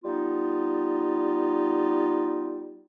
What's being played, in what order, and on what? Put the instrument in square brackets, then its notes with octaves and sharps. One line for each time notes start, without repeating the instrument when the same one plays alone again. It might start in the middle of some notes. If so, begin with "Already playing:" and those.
[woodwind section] G3 B3 D#4 F4